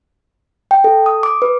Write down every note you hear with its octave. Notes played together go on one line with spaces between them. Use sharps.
G5
A4
D#6
D6
B4